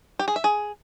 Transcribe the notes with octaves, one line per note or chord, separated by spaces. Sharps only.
G4
G#4
E5
G#4